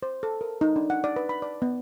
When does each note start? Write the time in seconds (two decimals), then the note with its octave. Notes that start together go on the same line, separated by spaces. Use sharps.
0.03 C5
0.23 A4
0.41 A#4
0.61 D#4
0.76 D4
0.90 F#5
1.04 D5
1.16 B4
1.29 B5
1.42 D5
1.62 B3